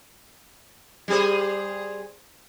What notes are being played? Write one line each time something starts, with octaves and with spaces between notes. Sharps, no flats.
G3 G#4 C5